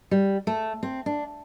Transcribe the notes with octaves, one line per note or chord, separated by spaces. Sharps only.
G3
A3
C4
D4